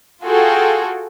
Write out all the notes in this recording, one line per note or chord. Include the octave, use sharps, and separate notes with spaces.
F4 F#4 G#4 A4 G5